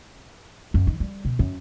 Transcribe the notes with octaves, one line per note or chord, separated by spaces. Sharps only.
F#2
D#3
G3
B2
F#2